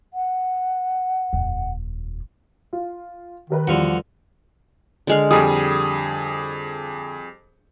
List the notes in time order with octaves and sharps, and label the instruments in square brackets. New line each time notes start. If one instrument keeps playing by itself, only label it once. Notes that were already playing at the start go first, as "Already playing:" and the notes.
[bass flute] F#5
[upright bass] D#1 F2
[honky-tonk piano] F4
[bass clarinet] D#3 [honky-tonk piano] G4 A#4 B4
[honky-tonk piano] E2 G3 [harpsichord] D3 F3 F#4
[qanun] D3 G#3 F5
[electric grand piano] F2 G#4 D#6 [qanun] G3